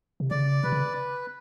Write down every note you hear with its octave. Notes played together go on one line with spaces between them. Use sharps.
C3
C#3 D5
C3 B4
C#3